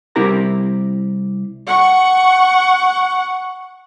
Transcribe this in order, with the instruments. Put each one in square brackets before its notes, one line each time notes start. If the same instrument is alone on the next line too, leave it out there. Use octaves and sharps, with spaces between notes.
[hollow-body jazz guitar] C2 C4 E4 G4 A#4 A#5
[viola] F#5 C#6